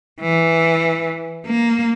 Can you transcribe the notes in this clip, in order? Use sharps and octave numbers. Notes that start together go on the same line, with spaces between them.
E3
A#3